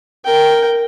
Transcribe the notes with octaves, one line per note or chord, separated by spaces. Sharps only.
A#4 G5